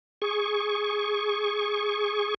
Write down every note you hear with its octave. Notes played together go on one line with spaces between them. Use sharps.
G#4 C#6